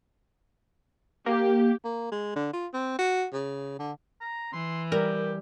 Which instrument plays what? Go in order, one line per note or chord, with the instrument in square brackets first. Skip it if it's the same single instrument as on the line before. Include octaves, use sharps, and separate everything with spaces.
[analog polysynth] A#3 [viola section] G4
[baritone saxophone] A#3
G#3
D3
F4
C4
F#4
C#3
D3
[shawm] A#5
[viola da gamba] E3 [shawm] C6
[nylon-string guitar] G3 [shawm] G4 [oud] A#4